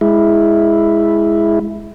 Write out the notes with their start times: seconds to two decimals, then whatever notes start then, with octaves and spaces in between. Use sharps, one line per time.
0.01 G#3 E4